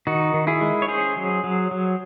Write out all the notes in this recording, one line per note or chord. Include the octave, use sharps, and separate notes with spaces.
D#3 D#4 F#4
D#3
E4 G#4
G#3
C#5
C#4 G#4 C5
F#3
F#3
F#3